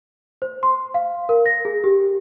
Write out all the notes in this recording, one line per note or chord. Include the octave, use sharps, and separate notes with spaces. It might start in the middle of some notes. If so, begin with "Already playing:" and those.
C5
C6
F5
A#4
A#6
G#4
G4